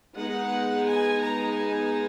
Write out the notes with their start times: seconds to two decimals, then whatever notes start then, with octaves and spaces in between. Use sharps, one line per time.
0.16 G#3 B3 D#4 F#5
0.85 G#5
1.20 A#5
1.53 G#5